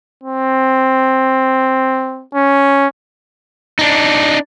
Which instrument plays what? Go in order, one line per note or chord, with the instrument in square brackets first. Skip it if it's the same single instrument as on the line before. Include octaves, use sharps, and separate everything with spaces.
[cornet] C4
C#4
[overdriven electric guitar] D4 D#4